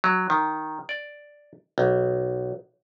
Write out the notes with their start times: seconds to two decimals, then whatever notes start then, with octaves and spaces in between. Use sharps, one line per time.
0.04 F#3
0.30 D#3
0.89 D5
1.78 B1